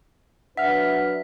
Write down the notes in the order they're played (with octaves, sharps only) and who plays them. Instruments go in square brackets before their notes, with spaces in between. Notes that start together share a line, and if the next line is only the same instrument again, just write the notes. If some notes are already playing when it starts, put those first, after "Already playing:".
[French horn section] F#3 D4 B4 [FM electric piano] E5 F6 [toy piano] F#5 [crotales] B6